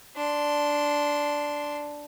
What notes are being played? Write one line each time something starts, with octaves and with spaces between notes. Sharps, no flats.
D4 C6